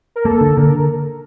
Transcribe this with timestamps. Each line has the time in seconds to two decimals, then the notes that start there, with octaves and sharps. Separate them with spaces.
0.16 A#4
0.25 A#3 A4
0.41 D3
0.57 D3 A#4